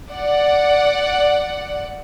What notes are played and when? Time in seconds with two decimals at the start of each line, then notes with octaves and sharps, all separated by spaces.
0.12 D5 F#5